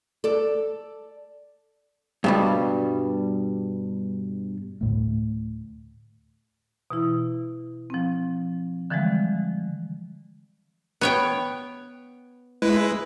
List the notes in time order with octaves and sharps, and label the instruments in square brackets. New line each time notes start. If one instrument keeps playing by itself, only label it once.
[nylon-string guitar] A4 D5
[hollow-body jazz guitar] G2 B2 G3
[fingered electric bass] D2 A2 A3
[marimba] B2 E3 E4
F3 C4
D3 E3 F3 G3 G#3
[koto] B3 C#5 G5
[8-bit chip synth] G#3 E4 B4